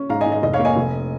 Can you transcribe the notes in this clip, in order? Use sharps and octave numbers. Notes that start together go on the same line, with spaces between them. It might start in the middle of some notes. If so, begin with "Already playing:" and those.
Already playing: C#4
G#2 F5 A#5
D#5 G#5
G#2
D#5
F1 D#5
C#5 F5
A#3
D#5 G#5
F1